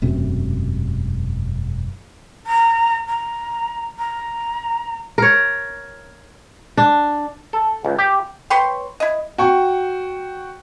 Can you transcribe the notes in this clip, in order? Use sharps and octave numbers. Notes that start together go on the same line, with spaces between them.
E1 F#2 C3 A3
A#5
A#5
A#5
A#4 C#5
D4
A4
C#2
G4
B4 C#5 G5 C6
E4 D#5
F#4 G5 C#6